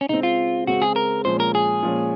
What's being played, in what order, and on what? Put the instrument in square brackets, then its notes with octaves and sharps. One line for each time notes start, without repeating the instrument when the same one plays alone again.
[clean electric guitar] C#4
[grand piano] C#3 G#3 C4 [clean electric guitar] D#4
[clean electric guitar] F4
[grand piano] C#3 G#3 C4 [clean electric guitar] F#4
[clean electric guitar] G#4
A#4
[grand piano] A#2 F3 G#3 C#4 [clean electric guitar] C5
[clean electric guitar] A#4
G#4
[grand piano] A#2 F3 G#3 C#4